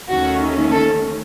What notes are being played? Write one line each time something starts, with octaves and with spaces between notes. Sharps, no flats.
D#2 D#3 A3 C#4 F#4
A4